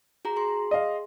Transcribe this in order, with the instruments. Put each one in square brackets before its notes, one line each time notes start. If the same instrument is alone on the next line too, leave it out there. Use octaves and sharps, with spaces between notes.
[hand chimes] F#4 G#4 A#5
G#4 C6
[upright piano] D#5 F5